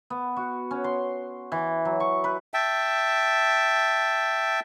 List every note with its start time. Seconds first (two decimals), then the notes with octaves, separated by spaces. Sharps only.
0.10 B3
0.37 F#4
0.71 C#4
0.84 C6
1.52 E3
1.85 F#3
2.00 C#6
2.24 B4
2.54 E5 G5 A5